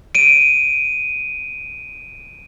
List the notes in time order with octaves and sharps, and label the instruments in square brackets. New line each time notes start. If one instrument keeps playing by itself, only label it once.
[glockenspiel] D7 D#7